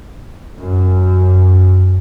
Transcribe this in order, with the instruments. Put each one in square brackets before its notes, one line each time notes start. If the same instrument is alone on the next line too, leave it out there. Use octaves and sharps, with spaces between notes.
[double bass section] F#2